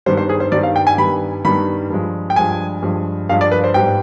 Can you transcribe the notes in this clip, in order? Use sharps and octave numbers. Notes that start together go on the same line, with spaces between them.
G2 D#3 G3 B3 C5
C5
G#4
C5
G2 D#3 G3 B3 D5
F5
G5
G#5
G2 D#3 G3 B3 B5
G2 D#3 G3 B3 B5
G2 F3 G#3
G5
G2 F3 G#3 G#5
G2 F3 G#3
G2 F3 G#3 F5
D5
B4
C5
G#2 G3 B3 G5